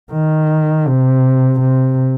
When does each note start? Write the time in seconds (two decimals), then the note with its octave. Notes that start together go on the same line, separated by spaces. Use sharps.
0.12 D#3
0.87 C3
1.61 C3